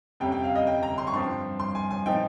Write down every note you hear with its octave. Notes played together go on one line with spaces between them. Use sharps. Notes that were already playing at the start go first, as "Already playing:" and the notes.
F2 C3 G3 C#4 G5
G5
F5
D#5
G5
A#5
C6
C#6
G2 F3 C4 C6
C6
G#5
G#5
A#2 F3 C4 D#4 G5